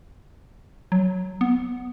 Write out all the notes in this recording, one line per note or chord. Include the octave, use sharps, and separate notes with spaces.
F#3
B3